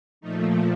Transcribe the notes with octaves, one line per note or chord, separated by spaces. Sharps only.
A#2 F3 A3 D#4